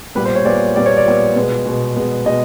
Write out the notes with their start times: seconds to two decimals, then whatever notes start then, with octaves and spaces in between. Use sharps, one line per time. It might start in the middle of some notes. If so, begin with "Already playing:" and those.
0.15 A#2 G3 B3 B4
0.25 C5
0.36 C#5
0.45 A#2 G3 B3 D5
0.75 A#2 G3 B3 D5
0.86 C#5
0.97 D5
1.06 A#2 G3 B3
1.36 B2 G#3 B3
1.66 B2 G#3 B3
1.96 B2 G#3 B3
2.26 B2 G#3 B3 D#5